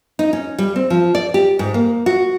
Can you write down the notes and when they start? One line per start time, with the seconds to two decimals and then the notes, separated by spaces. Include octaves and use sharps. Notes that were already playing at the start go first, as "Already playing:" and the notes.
0.19 D#4
0.33 C#4
0.58 G3
0.76 C4
0.90 F3
1.15 D5
1.34 G4
1.59 G#2
1.74 A#3
2.06 F#4